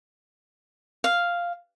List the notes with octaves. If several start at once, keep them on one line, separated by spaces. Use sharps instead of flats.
F5